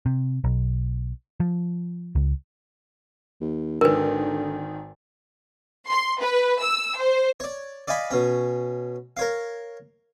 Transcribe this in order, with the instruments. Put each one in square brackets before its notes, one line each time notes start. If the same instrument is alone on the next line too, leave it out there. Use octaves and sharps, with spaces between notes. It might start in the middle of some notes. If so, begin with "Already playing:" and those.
[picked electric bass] C3
B1
F3
C#2
[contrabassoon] D#2
[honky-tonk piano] G#1 D#3 [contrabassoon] D3 [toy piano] A#4 B4
[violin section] C6
B4
E6
C5
[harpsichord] C#5 D5
D5 D#5 F5 G#5 B5
B2 C#4
A#4 C#5 F5